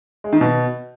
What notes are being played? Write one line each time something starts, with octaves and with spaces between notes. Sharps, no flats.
G#3
D#3
B2